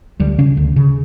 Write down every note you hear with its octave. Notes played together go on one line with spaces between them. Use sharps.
D2 G3
C#3 C#4
D2
C#3